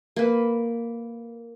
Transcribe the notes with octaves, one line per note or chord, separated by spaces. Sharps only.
A#3 B4